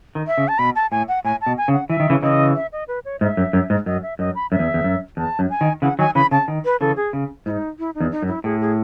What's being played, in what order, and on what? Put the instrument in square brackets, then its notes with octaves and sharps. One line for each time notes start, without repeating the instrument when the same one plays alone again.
[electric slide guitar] D#3
[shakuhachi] E5
[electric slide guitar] C#3
[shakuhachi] A5
[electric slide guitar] B2 [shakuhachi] B5
[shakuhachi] A5
[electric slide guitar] A2 [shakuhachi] G#5
[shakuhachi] F#5
[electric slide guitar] A2 [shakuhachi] G#5
[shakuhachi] A5
[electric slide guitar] B2
[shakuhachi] G#5
[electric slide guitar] C#3
[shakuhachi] F#5
[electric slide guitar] E3 [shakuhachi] E5
[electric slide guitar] D#3
C#3 E3
[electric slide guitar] C#3 E3 [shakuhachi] D#5
[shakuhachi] E5
D#5
B4
C#5
[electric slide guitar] G#2 [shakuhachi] E5
[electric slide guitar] F#2
F#2
G#2
[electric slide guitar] F#2 [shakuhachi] D#5
[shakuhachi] E5
[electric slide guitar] F#2 [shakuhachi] D#5
[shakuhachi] B5
[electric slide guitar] F#2 [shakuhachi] E5
[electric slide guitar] E2
E2
F#2
[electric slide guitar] E2 [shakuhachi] A5
[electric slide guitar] F#2
[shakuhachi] G#5
[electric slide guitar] D#3
[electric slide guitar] C#3 E3 [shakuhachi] F#5
[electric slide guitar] D#3 F#3 [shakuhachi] G#5
[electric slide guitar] C#3 E3 [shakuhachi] B5
[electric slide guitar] C#3 [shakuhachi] A5
[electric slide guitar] D#3
[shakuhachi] B4
[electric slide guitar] C#3 E3 [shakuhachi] A4
[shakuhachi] G#4
[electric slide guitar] C#3
[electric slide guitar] G#2 [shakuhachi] D#4 E4
[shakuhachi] E4
D#4
[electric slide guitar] E2
[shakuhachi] D#4
[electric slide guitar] F#2
[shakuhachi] E4
[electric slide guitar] A2 [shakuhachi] G#4
[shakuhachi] G#4